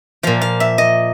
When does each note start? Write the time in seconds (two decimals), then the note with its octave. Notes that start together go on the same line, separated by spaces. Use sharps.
0.23 A#2 F3 F5
0.41 F5
0.60 E5
0.78 D#5